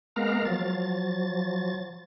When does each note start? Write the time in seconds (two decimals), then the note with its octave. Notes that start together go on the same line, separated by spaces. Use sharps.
0.16 G#3 A#3 B3 A#4 F5 A#5
0.45 F3 F#3 A6